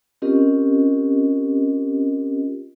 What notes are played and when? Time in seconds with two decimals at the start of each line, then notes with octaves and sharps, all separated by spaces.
0.22 C4 C#4 F4 G4 A#4 D#5